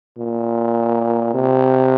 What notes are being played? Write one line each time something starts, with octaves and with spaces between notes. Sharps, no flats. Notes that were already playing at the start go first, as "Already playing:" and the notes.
A#2
C3